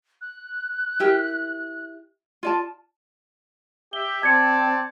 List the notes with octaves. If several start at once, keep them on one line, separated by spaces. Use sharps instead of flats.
F#6
E4 G4 A#4
F4 D5 A5
G4 E5 G7
C4 C5 D5 A5 G#6 C#7